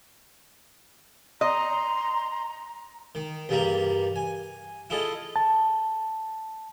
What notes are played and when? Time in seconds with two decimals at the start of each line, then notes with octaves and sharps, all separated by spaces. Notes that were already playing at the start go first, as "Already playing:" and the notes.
1.41 D#5 A#5 C6
3.15 D#3
3.49 E2 G2 G3 A#3 A#5
4.16 G#5
4.90 E4 F4 G#4 A4 D#5
5.36 A5